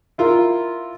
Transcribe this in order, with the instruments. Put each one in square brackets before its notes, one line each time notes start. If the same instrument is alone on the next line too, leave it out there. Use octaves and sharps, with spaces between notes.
[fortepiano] E4 F4 A#4